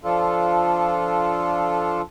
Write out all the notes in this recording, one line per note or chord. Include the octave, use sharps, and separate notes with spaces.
F3 D4 F4 A4